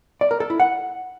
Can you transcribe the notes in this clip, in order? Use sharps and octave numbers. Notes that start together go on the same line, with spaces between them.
D5
A#4
A4
E4
F#5